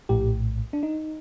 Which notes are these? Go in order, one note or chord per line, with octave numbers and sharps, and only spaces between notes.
A#1 A2 G4
D4
D#4